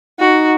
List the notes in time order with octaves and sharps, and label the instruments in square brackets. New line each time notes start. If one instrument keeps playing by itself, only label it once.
[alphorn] D#4 [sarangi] F#4